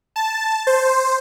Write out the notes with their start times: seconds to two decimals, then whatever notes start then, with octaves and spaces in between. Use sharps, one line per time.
0.16 A5
0.67 C5